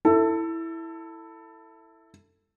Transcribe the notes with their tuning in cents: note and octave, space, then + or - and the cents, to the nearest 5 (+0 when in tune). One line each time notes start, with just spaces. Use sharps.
E4 +0 A4 +20